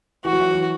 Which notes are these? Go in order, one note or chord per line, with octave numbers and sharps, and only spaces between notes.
E3 F#4
F#3
E3
E3